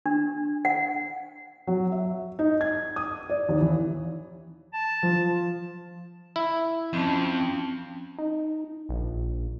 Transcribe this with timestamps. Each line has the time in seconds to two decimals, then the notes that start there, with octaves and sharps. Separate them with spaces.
0.06 D4
0.65 F#5
1.67 F#3
1.92 E5
2.39 D#4
2.61 G#6
2.96 D#6
3.30 D5
3.49 D#2
3.61 E3
4.73 A5
5.03 F3
6.36 E4
6.93 F2 C4 C#4 A5
8.18 D#4
8.89 A#1